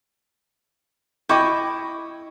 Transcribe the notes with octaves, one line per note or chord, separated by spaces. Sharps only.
E4 D#5 G5 C#6 D6